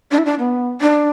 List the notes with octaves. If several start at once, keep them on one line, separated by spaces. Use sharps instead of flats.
D4
E4
D4
B3
D4